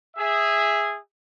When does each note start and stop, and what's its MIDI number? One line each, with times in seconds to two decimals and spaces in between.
0.16 0.96 68
0.16 0.96 76